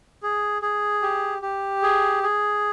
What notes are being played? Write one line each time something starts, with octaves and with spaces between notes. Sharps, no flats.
G#4
G#4
G4
G4
G#4
G#4